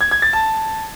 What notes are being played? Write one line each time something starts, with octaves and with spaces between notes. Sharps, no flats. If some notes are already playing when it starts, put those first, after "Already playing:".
G#6
G#6
A6
A5